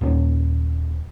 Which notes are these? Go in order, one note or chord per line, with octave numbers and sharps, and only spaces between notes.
D#2 A#2 C#4